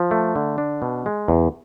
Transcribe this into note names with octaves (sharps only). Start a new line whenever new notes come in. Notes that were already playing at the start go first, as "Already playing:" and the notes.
Already playing: F3
A3
D3
D4
B2
G#3
E2